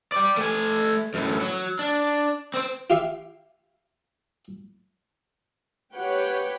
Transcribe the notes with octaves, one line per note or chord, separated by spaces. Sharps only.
D5 G5
A3 G#5
F#2 A2
F#3
D4
C4 C5
F4 G4 E5 F5
G4 B4 C#5 F#5 G5